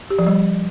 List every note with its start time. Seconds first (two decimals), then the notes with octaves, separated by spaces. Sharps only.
0.10 G4
0.18 F3
0.27 G3